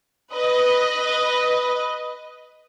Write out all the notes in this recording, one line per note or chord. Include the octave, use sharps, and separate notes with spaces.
B4 D#5